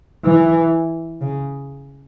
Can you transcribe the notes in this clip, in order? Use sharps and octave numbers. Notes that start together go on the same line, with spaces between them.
E3
C#3